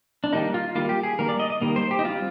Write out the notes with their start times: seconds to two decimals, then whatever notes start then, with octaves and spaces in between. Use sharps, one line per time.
0.24 D4
0.32 D#3 G3 A#3 D#4
0.54 F4
0.75 D#3 G3 A#3 F4
0.89 G4
1.03 G#4
1.19 D#3 G3 A#3 A#4
1.29 D5
1.40 D#5
1.50 D#5
1.61 D#3 G3 A#3
1.76 C5
1.91 G4
1.99 D#4
2.05 G3 C4 F4